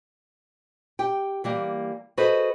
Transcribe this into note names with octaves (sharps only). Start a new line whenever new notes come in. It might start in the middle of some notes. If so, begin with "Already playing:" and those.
G4 G5
E3 G3 A#3
F#4 G#4 A4 B4 C5 D#5